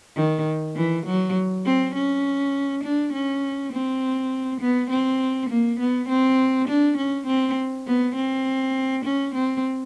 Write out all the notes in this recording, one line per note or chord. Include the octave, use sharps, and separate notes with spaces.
D#3
E3
F#3
C4
C#4
D4
C#4
C4
B3
C4
A#3
B3
C4
D4
C#4
C4
B3
C4
C#4
C4